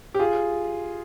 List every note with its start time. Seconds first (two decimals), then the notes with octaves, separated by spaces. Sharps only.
0.14 G4
0.19 F4 G#4